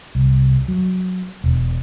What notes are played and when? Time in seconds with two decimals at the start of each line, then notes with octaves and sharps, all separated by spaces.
0.15 C2
0.68 F#3
1.44 E1